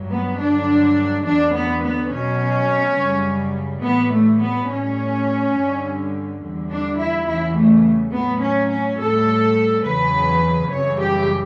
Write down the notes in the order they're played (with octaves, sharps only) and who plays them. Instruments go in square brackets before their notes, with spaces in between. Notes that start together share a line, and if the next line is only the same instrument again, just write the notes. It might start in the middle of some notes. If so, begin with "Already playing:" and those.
Already playing: [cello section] G2 F#3
B3
G2 D3 F#3 D4
E2 D3 F#3 D4
B3
B3
B2 F#3 C#4
F#2 C#3 G3
A2 E3 G3 B3
A3
B3
A2 G3 C#4
G2 D3 G3
E2 D3 G3
D4
E4
E2 C#3 E3 G3 E4
A3
A2 F#3 B3
C#4
C#4
A2 G3 A4
E2 C#3 F#3 B4
F#2 C#3 E3 G3 C#5
G4